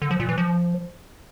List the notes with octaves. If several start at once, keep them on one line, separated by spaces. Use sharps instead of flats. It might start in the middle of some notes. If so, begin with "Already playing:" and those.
D3
F3
A#2
E3
F3